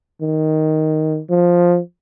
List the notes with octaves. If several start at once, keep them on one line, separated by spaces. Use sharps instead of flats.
D#3
F3